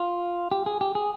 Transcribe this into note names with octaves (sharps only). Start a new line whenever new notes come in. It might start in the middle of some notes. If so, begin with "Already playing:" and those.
Already playing: F4
G4
G#4
G4
G#4